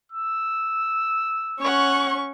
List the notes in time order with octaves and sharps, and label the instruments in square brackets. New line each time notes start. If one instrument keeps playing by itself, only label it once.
[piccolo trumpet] E6
[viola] C#4 C#6 [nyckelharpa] C#5 F#5